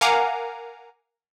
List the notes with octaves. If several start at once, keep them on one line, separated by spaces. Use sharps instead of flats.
A#4 F5 F#5 G#5 A#5 D6